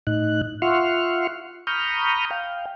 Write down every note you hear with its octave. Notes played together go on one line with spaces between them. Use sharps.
A2 D#4 F#6
F4 E5 F#5 C6 C#6 F6
A#5 B5 C#6 D#6 F6 G6
F5 G5